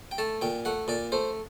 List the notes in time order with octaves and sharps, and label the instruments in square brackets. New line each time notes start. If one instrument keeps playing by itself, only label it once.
[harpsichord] G5
A3 A5
A#2 G5
A3 F#5
A#2 D5
A3 C5